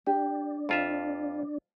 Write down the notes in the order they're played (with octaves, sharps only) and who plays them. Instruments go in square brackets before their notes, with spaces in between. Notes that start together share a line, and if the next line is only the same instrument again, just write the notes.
[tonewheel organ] D4 [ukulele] G4
[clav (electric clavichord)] F2 F4 E5 [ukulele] A5